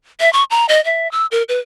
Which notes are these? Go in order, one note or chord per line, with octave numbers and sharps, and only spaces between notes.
E5
C#6
A#5
D#5
E5
E6
A#4
B4